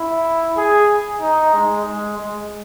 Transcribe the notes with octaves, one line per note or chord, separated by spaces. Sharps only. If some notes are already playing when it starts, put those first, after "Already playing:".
Already playing: E4
G#4
D#4
G#3
G#3
G#3